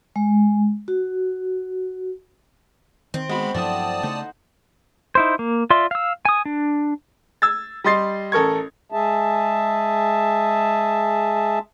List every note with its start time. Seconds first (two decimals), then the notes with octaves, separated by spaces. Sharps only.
0.16 G#3
0.88 F#4
3.14 D#3 C4
3.29 G#3 B3 F#4 B5
3.54 G2 F3 F#3 A3 E4 D5 A5 D#6
4.03 C#3 A3 D#4 C5 F#5
5.15 D#4 E4 C5
5.39 A#3
5.70 F4 D5 E5 C6
5.91 F5 E6
6.25 G#5 D#6
6.46 D4
7.42 E6 G#6 A6
7.84 G3 D#5 C6 A6 C7
8.32 A1 A4 A#4 C#6 G#6
8.92 G#3 G#4 E5 A5